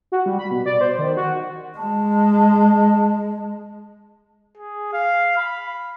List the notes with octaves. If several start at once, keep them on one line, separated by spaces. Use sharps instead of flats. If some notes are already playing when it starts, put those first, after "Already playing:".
F#4
G3
B5
B2
D5
C5
D#3
F#4
G#3 A5
G#4
F5
B5